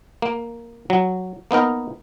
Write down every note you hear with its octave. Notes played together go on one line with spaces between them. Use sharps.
A#3
F#3
A#3 B3 D#4 A#4